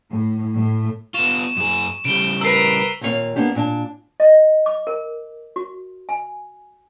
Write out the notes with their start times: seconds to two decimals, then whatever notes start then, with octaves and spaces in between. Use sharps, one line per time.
0.11 A2
0.56 A2
1.14 B3 F4 C#6 E7
1.57 F#2 G#4
2.05 C#3 G3 D7 G7
2.41 A#4 B4 E6 C7
3.01 D#2 A#2 A#3 E4 C#5 F5
3.36 A#3 B3 D4 G4
3.55 A#2 D4 A5
4.20 D#5
4.66 D6
4.87 A#4
5.56 F#4
6.09 G#5